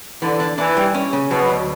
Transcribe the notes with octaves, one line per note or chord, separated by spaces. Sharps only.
D3 E3
D4
E3 D4
G3
C#4
C#3
B2 F#3
D2